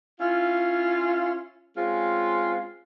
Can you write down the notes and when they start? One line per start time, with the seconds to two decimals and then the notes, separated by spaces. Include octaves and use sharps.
0.20 C#4 E4 F4
1.77 G#3 C4 C#4 F4